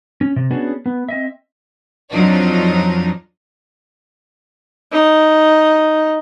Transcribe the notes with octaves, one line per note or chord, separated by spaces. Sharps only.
C#4
C3
B3 C#4 D4 F#4 G#4
B3
C4 D#5 E5
F2 F3 F#3 D4 D#4
D#4